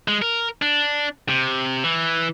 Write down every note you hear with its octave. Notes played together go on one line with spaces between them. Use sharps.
G#3
A#4
D4
C3
E3